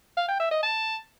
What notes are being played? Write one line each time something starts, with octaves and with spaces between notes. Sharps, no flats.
F5
G5
E5
D#5
A5